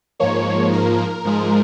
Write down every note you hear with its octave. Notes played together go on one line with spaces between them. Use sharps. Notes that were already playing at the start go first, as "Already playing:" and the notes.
G#2 F3 A#3 C#5
A#4
G#2 F3 G#3